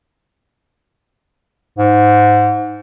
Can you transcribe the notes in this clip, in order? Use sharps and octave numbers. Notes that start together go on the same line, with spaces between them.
G#2